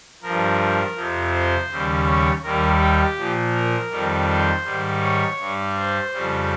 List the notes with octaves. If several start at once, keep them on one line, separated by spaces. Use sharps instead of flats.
G2 F3 A#4
F2 C3 F3
C5
D#2 C#3 G3
C#5
D#2 D#3 G3 A#4
G4
A#2 F3
A#4
F2 D#3 G3
C5
G#2 D#3 G3
C#5
G2 G3
C5
F2 C#3 G3